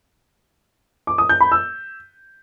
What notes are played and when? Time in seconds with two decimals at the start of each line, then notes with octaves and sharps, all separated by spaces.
1.07 D6
1.18 D#6
1.29 G6
1.41 B5
1.52 E6